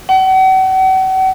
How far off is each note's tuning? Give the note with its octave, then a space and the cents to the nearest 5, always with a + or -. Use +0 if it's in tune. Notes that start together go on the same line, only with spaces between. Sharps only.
F#5 +40